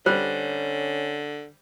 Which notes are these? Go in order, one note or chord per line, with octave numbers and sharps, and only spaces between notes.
D3 G3 C#4 C5